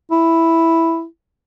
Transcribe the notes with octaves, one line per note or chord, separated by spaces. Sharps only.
E4